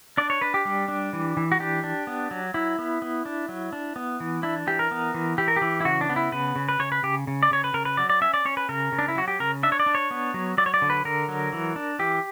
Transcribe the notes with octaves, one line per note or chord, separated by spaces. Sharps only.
D4 D5
C#5
D4 B4
G4
G3
D4
E3
E3
F#4
D4 G4
D4
B3
F#3
F#3 E4
B3
B3
D4
F#3
D4
B3
E3
D4 E4
E3 G4
A#4
B3
E3
E3 G4
A#4
G4
E3
E4
C#3 F#4
D4
B3
E4
C#3 B4
C#3
B4
C#3 C#5
B4
C#3 G4
C#3
D5
C#3 C#5
B4
C#3 A#4
B4
F#3 D5
D5
C#4 E5
D5
C#4 C#5
B4
C#3 A#4
C#3
D4
E4
F#3 F#4
G4
C#3 A#4
D4 E5
C#5
D5
D4
C#5
B3
F#3
F#3 D5
C#5
D5
D3
B4
D3 A#4
F#3
E3
D4
E3 G4